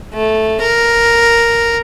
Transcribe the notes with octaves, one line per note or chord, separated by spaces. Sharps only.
A3
A#4